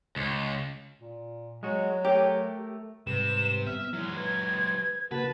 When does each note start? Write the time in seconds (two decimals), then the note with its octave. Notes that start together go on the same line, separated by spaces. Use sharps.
0.16 C#2
1.01 A#2
1.63 F#3 G#3 F#4
2.05 A3 G4 A#4 C#5
3.07 G#2 C3 G3 B4 E7
3.67 B3 E5 F6
3.93 E3 F#3 G#3
4.17 B4 G#6
5.11 C#3 A#3 F#4 B4 A5